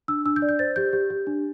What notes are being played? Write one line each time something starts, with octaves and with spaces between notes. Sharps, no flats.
D4 E6
D4 E6
G6
D5
G6
C5 A6
G4 G6
G4
G4
D4